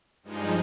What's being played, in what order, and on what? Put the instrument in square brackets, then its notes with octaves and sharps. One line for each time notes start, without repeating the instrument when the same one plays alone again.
[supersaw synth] G2 F3 G#3 D#4